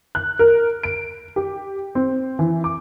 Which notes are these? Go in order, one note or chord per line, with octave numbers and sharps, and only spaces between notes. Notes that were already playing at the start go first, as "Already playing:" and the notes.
F#6
A#4
D7
G4
C4
E3
D6